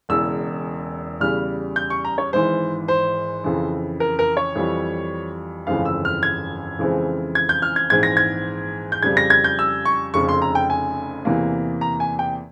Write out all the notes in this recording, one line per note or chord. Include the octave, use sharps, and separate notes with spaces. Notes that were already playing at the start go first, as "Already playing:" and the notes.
E1 E2 C#3 E6
E2 C#3 G3 F6
G6
C#6
A#5
C#5
G#1 G#2 E3 C5
C5
F2 C#3 E3
A#4
A#4
C#5
F2 E3 G3
G1 F2 C#3 E3 G#3 F5
E6
F6
G#6
F2 C#3 E3 G#3 C4
G#6
G6
F6
G#6
A#1 G#2 E3 G#3 C4 G#6
A#6
G#6
G6
F2 C#3 G3 G#6
A#6
G#6
G6
E6
C#6
F1 F2 C#3 C#6
C6
A#5
G5
G#5
E2 C3 E3 A#3
A#5
G#5
G5